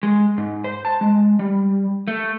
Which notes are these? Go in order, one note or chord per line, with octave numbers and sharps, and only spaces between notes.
G#3
G#2
C5
A5
G#3
G3
A3